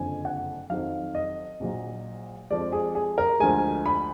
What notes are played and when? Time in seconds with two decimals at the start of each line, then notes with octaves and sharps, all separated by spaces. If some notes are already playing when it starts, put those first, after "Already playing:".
Already playing: F#1 F2 D3 F3 G#5
0.25 F#5
0.70 F2 D#3 F#3 F5
1.15 D#5
1.60 A#1 A#2 F#3
2.50 F2 F3 G#3 D5
2.72 G#4
2.95 G#4
3.18 A#4
3.39 D2 D3 F3 G#3 G#5
3.86 B5